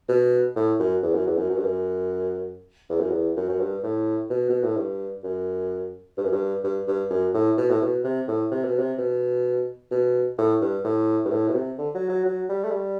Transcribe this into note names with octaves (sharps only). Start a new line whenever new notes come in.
B2
A2
F#2
E2
F#2
E2
F#2
F#2
G2
F#2
E2
F#2
E2
F#2
F#2
G2
A2
B2
B2
A2
G2
F#2
G2
F#2
G2
G2
G2
F#2
A2
B2
A2
B2
C3
A2
C3
B2
C3
B2
B2
A2
G2
A2
G2
A2
B2
C3
D3
F#3
F#3
F#3
G3
A3
G3